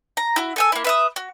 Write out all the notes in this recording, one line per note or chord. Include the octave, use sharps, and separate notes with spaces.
A#5
E4 F#4
A4 G#5 E6
A#3 E4
B4 E5 D#6
F#4